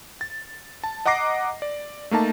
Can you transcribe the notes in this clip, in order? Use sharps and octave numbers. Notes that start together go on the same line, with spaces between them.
A6
A5
D#5 F#5 A#5 D6 A#6 C7
D5
A3 A#3 D#4 A5